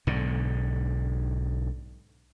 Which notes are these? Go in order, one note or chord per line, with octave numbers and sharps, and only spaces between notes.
B1 G#2 D3